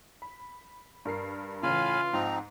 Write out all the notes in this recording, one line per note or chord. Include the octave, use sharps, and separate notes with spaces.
B5
G2 A#4 C7
A2 C#3 E3 F4 F5 G#5 B5
G#2 F3 C4 D#4 A#5